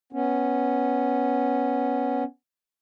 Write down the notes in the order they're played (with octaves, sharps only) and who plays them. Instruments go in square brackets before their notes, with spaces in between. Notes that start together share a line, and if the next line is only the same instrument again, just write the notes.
[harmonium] B3 C#4